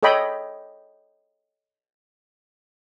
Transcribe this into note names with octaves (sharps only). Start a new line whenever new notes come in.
A4 C#5 D#5 G5 B5